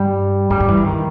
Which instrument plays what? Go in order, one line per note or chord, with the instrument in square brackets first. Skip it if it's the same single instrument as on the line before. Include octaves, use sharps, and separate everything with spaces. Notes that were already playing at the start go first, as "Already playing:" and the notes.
Already playing: [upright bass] G2 [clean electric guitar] G3
[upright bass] G2 [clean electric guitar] G3
[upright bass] G#2
[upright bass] G2 [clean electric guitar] E3
[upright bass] E2
[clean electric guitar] D#3